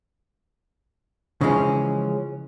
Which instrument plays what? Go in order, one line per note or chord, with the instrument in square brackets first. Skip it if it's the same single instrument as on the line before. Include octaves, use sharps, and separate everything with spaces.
[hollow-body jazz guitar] C#3 E3 F3 G#3 C#4